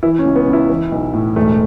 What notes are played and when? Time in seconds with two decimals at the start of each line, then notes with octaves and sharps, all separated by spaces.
0.03 E3 E4
0.19 C#4
0.25 C#2
0.36 B3
0.47 C#2
0.53 E4
0.70 E3
0.92 B1
1.14 A2
1.36 E1 A3